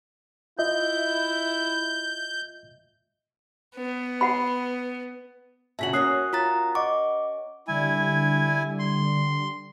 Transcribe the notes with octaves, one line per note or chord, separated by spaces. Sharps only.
E4 F4 D#5 E5 G6
B3
F#5 B5
A#2 C#3 F#4 E5 A5 B6 F#7
C#4 F#4 A#4 D#6 F#6 C7
F4 A#5 A6
D#5 F#5 C#6 D6
D3 G3 E4 G#5
C6